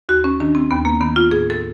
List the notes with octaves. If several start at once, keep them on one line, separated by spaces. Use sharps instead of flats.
D#2 F#4
C#4
D#3 D4
C4
D#2 B3
A#3
D#3 B3
F4
A2 G#4
A4